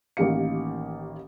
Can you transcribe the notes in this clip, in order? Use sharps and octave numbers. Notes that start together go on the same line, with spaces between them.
A1 D#3 A#3 G4 F5 C#7